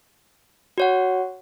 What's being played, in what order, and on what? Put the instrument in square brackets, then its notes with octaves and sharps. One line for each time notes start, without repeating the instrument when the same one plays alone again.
[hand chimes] F#4 C#5 F#5